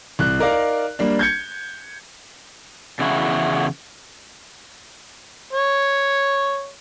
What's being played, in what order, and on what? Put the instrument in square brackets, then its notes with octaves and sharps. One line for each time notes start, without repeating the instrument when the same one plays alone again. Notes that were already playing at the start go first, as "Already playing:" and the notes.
[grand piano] C2 F#6
D#4 A#4 D5 F5
G3 A#3 D4
G6 G#6 C#7
[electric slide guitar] E2 C#3 E4 F#4
[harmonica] C#5